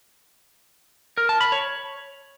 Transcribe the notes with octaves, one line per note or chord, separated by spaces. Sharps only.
A#4
A5
B5
C#5